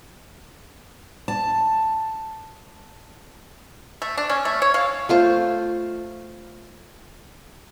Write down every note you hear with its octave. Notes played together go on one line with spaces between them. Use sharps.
A5
A3
D4
C#4
A3
C#5
F5
A3 F4 C5